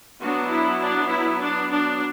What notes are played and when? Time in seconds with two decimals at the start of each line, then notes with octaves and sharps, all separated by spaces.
0.20 F#3 B3 D4 F#4
0.50 E4
0.80 D4
1.10 E4
1.40 D4
1.71 D4